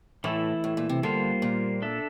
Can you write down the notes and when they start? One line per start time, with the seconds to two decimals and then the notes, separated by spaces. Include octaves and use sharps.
0.24 A2 E3 A3 E4
0.64 A2
0.77 A#2
0.89 C3
1.03 D3 G3 A#3 F4 C5
1.42 A#2
1.82 D4 A4 E5